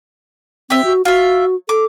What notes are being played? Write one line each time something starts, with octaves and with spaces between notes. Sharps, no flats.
C4 G4 E5
F#4
F4 F#4 E5
A4 D6